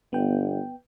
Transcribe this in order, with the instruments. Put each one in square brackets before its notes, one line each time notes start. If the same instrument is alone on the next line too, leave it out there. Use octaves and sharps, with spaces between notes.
[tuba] G1 [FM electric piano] B3 G5